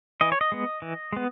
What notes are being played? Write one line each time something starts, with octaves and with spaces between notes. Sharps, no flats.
E3 D#5
C#5
D#5
G#3 B3
E3
G#3 B3